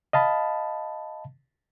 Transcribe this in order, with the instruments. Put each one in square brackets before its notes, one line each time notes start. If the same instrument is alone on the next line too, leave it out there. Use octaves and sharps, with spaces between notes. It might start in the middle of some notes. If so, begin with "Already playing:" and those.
[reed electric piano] D#5 F5 A5 B5